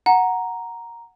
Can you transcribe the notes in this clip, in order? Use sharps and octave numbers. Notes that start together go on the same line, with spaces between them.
F#5 A#5